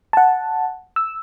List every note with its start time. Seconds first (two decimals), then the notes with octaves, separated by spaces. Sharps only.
0.13 F#5 A5
0.96 E6